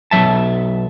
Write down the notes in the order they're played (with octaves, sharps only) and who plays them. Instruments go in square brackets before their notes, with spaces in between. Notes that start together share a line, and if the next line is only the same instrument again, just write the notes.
[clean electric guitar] B1 F2 F#3 E5 A5